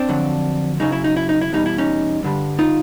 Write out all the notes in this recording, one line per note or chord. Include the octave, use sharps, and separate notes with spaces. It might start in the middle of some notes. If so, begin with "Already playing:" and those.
Already playing: C4 D4
F2 D3 F#3
F#2 C#3 F#3 D#4
E4
D#4
E4
D#4
E4
E2 B2 G3 D#4
E4
C#4 D#4
G2 D3 G3
D#4 F4